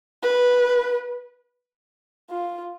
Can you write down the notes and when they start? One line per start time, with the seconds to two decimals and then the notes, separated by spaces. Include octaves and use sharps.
0.23 B4
2.30 F4